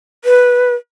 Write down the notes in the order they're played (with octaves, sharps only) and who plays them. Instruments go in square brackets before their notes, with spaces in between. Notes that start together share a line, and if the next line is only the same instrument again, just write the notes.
[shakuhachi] B4